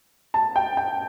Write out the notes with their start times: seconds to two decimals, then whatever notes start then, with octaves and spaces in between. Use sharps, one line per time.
0.34 A5
0.56 G5
0.77 G5